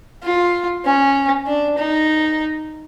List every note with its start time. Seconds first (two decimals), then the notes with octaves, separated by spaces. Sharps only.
0.23 F4
0.85 C#4
1.47 D4
1.78 D#4